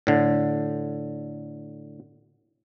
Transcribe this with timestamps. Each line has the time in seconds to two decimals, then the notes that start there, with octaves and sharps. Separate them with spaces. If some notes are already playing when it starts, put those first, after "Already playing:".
0.07 A2 D3